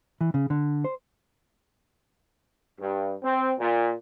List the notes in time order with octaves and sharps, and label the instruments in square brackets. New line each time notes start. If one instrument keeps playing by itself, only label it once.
[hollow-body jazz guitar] E3
C#3
D3
C5
[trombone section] G2
C4
A#2